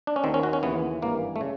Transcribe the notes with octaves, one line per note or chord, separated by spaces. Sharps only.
D4
C#4
D#2 D#3 C4
C#4
F#4
C#4
D#2 C#3 E3 B3
G#1 G2 E3 A#3
A3
C#3